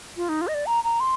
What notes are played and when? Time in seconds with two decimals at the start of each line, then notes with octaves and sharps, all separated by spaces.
0.17 F4
0.29 D#4
0.41 F4
0.48 D#5
0.54 D5
0.66 A#5
0.84 A#5
1.00 C6